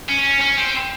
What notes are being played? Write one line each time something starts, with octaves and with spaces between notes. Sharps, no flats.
C#4
C#4
C4